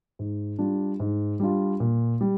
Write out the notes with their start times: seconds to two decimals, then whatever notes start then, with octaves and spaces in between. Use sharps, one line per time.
0.19 G#2
0.59 G3 D4 F4
1.00 G#2
1.40 G3 D4 F4
1.80 A#2
2.21 G3